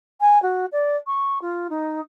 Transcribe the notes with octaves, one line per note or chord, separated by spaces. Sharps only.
G#5
F#4
D5
C#6
F4
D#4